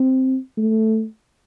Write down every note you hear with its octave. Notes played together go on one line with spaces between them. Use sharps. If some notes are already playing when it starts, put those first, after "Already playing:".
Already playing: C4
A3